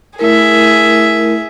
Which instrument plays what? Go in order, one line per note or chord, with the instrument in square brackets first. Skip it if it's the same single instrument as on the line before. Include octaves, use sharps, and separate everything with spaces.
[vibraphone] A3 E4 A#4 [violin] G#4 E5